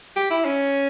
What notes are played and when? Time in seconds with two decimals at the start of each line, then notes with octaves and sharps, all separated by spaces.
0.16 G4
0.30 E4
0.45 C#4